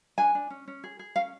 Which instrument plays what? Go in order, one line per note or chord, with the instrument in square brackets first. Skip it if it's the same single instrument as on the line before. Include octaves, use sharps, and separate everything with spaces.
[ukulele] D4 G#5
D4
C#4
C#4
G#4
G#4
C#4 F5